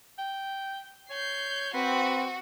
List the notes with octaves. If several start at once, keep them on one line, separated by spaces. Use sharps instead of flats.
G5
C#5 G6 C7
C4 F#4 B4